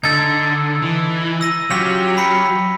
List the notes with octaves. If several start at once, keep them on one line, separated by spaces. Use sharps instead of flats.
D3 D#4 A4 G#6
E3
E6 A#6 D#7
F#3 C#4 F4 G4 B6 F7
B5 B6 C#7